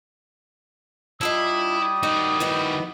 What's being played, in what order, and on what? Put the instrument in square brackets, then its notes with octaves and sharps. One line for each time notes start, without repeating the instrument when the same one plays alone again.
[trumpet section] G3 D#6 [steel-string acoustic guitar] D4 F4 D#5 [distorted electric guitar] E4
[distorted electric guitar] D#3 F#4 [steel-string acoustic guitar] D#4
[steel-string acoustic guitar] B3 D#4 E4